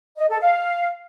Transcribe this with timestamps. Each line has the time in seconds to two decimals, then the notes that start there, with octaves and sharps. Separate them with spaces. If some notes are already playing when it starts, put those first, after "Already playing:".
0.17 D#5
0.29 A4
0.41 F5